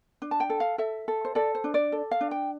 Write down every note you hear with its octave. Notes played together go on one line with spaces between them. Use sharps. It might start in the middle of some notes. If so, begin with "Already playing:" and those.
D4
A5
G5
A4
F5
A4 E5
A4
C5
A4 D5
C5
D4
D5
A4
F5
D4
G5